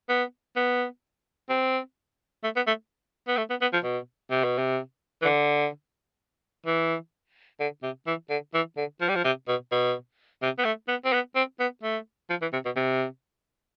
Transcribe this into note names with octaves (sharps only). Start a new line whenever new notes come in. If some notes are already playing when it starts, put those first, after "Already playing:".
B3
B3
C4
A3
B3
A3
B3
A3
B3
B3
F3
B2
C3
B2
C3
E3
D3
E3
D3
C3
E3
D3
E3
D3
F3
G3
F3
C3
B2
B2
C3
B3
A3
B3
C4
B3
C4
B3
A3
F3
E3
C3
B2
C3